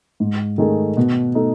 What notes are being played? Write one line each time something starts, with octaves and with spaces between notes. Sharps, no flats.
G#2
D#3 A3 D#4 G#4
B2
A3 D#4 A4